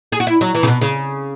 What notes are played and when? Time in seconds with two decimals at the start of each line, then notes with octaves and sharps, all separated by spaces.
0.12 G#4
0.20 F#4
0.27 E4
0.41 F#3
0.54 E3
0.63 C#3
0.67 B2
0.81 C#3